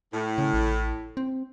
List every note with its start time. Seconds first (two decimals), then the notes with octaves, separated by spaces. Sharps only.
0.13 A2
0.38 C#3
0.54 A1
1.17 C4